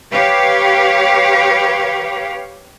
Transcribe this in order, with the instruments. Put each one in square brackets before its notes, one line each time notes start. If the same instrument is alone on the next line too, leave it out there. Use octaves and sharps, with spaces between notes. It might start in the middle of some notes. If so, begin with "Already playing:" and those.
[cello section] G4 B4 C#5 F5